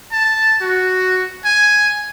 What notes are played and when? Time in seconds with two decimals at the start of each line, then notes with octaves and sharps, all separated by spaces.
0.12 A5
0.62 F#4
1.45 G#5